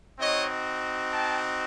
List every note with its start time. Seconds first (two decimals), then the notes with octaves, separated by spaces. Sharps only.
0.20 C4 D#4 F#4 C#5 D#5
1.11 G5 A5